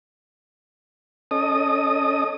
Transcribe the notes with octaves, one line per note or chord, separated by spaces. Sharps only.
C#4 A4 D#5 D#6